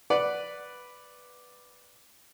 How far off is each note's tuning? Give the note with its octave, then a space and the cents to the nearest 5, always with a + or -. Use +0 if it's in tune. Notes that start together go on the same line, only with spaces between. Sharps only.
B4 +0 D5 +0 F#5 +0